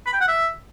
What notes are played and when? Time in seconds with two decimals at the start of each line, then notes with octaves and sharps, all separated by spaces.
0.06 B5
0.13 G5
0.21 F#5
0.28 E5